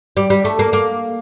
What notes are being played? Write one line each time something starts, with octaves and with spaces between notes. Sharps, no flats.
G3
G3
A3
A#3
A#3